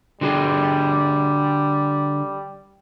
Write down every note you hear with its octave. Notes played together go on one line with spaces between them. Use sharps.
D3 G3 F#4 G#4